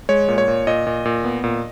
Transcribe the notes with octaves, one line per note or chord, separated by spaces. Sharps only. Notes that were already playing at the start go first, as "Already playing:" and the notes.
G#3 C#5
A#2
C#5
A#2
A#2 D#5
A#2
A#2
B3
A#2